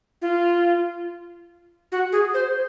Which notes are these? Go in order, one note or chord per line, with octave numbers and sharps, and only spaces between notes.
F4
F#4
G#4
C5